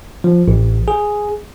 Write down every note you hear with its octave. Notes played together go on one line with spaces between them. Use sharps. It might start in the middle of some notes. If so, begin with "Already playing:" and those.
F3
A1
G#4